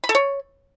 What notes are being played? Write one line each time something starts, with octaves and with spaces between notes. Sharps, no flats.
B5
A4
C#5